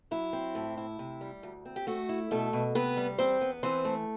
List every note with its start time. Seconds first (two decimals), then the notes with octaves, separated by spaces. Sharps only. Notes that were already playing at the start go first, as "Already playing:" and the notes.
0.11 F#3 E4
0.33 C4
0.55 A2
0.77 E4
0.99 C3
1.21 G3
1.43 D2
1.65 C4
1.76 G4
1.87 A3 F#4
2.09 E4
2.31 B2 A3 A4
2.53 B2
2.75 C3 B3 B4
2.97 G3
3.18 E2 C4 C5
3.41 B3
3.63 E3 C4 C5
3.85 A3